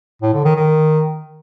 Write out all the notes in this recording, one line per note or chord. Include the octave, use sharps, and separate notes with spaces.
A2
D3
D#3
D#3